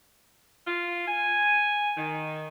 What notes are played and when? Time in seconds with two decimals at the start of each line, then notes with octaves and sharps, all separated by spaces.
0.66 F4
1.08 G#5
1.97 D#3